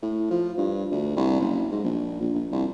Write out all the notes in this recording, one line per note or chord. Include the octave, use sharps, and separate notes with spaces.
A2
F3
G2
D2
C2
F#1
G#2
A#1
A#1
A#1
C2